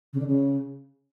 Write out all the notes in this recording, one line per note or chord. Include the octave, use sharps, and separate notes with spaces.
C#3
D3
C#3